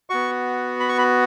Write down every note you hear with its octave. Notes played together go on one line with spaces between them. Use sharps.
B3 F#4 C#6
B5
C#6
B5